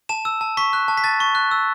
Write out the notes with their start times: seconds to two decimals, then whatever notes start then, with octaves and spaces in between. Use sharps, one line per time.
0.09 A5 E7
0.25 E6
0.41 A5
0.57 C#6 B6
0.73 F#6
0.88 A5
0.97 B6
1.04 A5 A6
1.20 C#6
1.35 F#6
1.51 E6